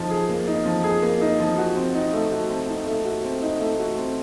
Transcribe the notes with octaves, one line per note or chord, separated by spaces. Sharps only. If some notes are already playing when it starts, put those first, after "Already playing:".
Already playing: F3 D#4
G#4
A#3
D#4
F3
G#4
A#3
D#4
F3
F#4
C4
D#4
A3
F#4
C4
D#4
A3
F#4
C4
D#4
A3
F#4
C4